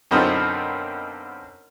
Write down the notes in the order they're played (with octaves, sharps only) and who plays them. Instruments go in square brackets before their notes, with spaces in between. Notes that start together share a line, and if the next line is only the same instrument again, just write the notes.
[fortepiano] F#2 B2 D3 C4 D#4 F4